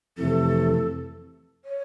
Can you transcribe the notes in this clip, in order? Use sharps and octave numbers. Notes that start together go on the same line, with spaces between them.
F2 C3 E3 A3 A4
C#5